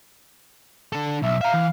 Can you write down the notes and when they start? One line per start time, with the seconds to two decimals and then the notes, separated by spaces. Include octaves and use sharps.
0.92 D3 A4
1.22 B1 E5
1.41 E5 F5 A#5
1.54 E3